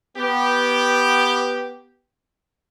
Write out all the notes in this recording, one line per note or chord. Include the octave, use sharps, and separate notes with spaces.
B3 G4